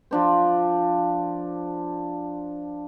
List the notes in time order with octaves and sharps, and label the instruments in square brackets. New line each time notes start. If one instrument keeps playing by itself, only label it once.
[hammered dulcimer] F3 D4 C5